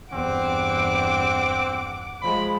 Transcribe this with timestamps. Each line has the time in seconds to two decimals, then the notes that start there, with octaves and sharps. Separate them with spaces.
0.12 E2 G2 C4 F#5 D6
2.22 F3 G#3 B5